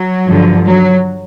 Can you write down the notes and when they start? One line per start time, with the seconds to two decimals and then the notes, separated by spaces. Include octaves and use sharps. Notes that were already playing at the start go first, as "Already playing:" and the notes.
Already playing: F#3
0.27 G2 D3 F3
0.66 F#3